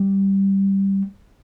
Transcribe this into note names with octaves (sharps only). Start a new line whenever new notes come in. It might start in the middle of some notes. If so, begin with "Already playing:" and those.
Already playing: G3